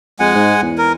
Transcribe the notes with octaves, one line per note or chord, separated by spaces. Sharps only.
F2 G#3 F#5 G#5
G#2
E2
A#4